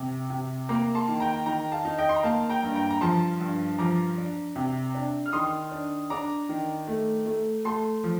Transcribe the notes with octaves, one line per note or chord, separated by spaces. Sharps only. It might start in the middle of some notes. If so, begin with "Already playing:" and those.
Already playing: C3
C3
A#3 A#5 D6
A5 C6
D#3
G5 A#5
D#3 G5 A#5
F5 A5
D#4
D#5 G5
C6
A#5
A#3 F5 A5
G5 A#5
G2
G5 A#5
A#5
F3 A5 C6
G2
F3 A#5 D6
D4
C3
D4
F6
D#3 C6 D#6
D4
D4 A#5 D6
D#3
A3
A3
A3 A5 C6
F3